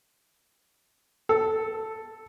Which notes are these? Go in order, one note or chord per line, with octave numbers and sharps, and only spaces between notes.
A4